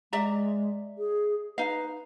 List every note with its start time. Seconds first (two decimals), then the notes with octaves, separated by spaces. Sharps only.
0.13 G#3 D5 E5 A#5
0.98 G#4
1.58 D#4 B4 F5